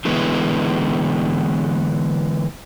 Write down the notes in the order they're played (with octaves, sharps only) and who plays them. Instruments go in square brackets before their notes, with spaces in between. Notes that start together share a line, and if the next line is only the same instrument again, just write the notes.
[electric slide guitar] D3 E3 G#3 B3 E4